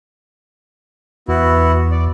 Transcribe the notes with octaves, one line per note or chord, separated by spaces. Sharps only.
E2 B3 E4 F#4
D5